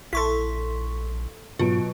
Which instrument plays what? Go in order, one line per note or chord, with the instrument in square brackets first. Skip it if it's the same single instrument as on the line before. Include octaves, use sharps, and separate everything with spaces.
[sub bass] A#1 [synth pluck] E4 A4 [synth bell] C6 C#6 B6
[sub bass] G#2 [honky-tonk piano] B2 F#3 D7 [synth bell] F4